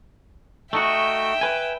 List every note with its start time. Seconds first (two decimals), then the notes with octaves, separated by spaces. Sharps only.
0.73 A3 D#4 F#4 E5 G5
1.41 B4 G#5